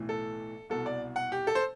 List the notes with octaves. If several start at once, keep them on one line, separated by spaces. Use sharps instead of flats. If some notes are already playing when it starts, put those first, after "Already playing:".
Already playing: B1 A2 E3
A4
C2 B2 A4
D5
F#5
G4
A4
C5